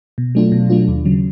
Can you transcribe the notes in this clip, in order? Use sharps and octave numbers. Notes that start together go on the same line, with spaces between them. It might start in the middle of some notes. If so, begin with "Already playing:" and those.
B2
F#3 A3 D4 F4
B2
F#3 A3 D4 F4
D#2
C#3 F#3